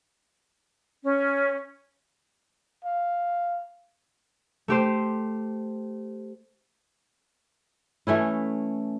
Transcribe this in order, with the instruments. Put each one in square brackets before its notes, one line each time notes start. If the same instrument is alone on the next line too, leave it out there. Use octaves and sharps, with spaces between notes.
[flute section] C#4
[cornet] F5
[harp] A3 G4 C5
[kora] E3 A3 C#4 E4